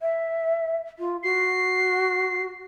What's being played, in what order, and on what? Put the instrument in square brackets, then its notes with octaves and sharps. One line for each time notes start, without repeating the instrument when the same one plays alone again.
[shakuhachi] E5
F4
[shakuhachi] F#4 [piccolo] C7